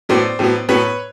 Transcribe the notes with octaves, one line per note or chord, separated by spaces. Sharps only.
A2 F#3 B3 C5 D5
A2 F#3 B3
A2 F#3 B3 B4 C#5